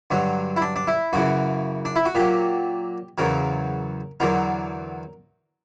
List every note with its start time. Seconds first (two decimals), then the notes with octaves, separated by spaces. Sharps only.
0.11 G2 D3 F#3
0.57 E4
0.62 D4
0.76 D4
0.87 E4
1.13 F#2 C#3 E3 F#4
1.85 D4
1.96 E4
2.05 F#4
2.15 A#2 F#3 G4
3.18 E2 C#3 F#3 A#4
4.20 E2 D3 F#3 A#4